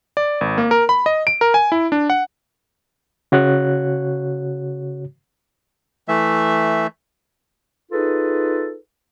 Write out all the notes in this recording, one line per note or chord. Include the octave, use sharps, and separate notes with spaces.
D5
G#1
A#3
A#4
B5
D#5
D7
A#4
G#5
E4
D4
F#5
C#3 F#4 C#5 F#6
E3 A3 E5
D#4 F4 G#4 A4 B4